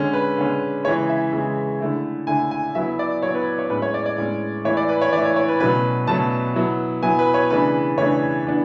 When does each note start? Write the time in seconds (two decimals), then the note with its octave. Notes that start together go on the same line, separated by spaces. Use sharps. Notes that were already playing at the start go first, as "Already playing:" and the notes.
Already playing: D3 G#3 C#4
0.13 B4
0.38 D3 G#3 C#4
0.85 C#3 E3 G#3 C#5
1.09 E5
1.33 C#3 E3 G#3
1.80 D3 A3 E4
2.27 D3 A3 E4 G#5
2.51 G#5
2.75 F#3 B3 E4 E5
2.99 D5
3.22 F#3 B3 E4 C#5
3.34 B4
3.59 C#5
3.70 A2 G#3 C#4 B4
3.82 C#5
3.94 D5
4.06 D5
4.18 A2 G#3 C#4
4.65 E3 A3 E4 C#5
4.77 D5
4.89 B4
5.01 C#5
5.13 E3 A3 E4 D5
5.25 C#5
5.36 C#5
5.48 B4
5.60 B2 F#3 A3 C#4 B4
6.07 B2 F#3 A3 C#4 A5
6.55 F#3 B3 E4
7.02 F#3 B3 E4 G#5
7.19 B4
7.34 C#5
7.50 C#3 E3 A3 D4 B4
7.97 C#3 E3 A3 D4 C#5
8.46 E3 B3 D4